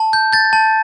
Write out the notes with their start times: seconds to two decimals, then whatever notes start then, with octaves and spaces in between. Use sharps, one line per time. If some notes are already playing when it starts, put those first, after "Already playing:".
Already playing: A5
0.13 G6
0.33 G6 A6
0.53 A5